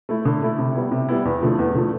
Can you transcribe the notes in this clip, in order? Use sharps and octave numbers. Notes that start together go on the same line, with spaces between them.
A3 E4
D3
A3 E4
C3
G3 B3 E4
C3
G3 B3 E4
E2
D3 F3 A3
E2
D3 F3 A3